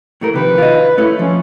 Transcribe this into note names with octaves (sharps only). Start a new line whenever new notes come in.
A2 A3 A#4
C3 D#3 F3 B4
F4 D#5
A3 C#4 E4
F3 C#4